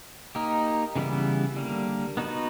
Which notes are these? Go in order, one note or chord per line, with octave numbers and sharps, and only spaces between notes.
A#3 D#4 G4
C#3 E3 G3 B3 E4
D3 G3 A#3
B3 D#4 F#4 B4